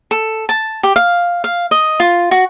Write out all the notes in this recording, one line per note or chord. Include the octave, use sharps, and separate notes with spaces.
A4
A5
G4
F5
F5
D#5
F4
F#4